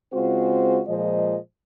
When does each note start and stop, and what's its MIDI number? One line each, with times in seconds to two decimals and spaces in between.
0.14 0.81 49
0.14 0.81 56
0.14 0.81 60
0.14 0.81 65
0.14 0.81 66
0.14 0.81 72
0.88 1.38 46
0.88 1.38 53
0.88 1.38 56
0.88 1.38 72
0.88 1.38 75